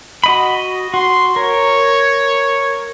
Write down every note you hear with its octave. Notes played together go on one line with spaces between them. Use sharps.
F#4 D#5 B5
F#4 C6
A#4 C#5